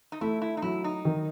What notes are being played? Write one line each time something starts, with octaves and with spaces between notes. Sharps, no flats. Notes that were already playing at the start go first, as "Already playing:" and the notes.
D#4
A3 E4
E4
D#4
F#3 E4
D#4
D#3